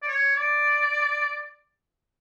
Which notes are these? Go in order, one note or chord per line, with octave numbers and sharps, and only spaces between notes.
D5
C#5
D5